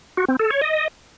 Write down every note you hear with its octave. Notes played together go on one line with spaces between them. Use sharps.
F#4
C4
A4
C#5
D#5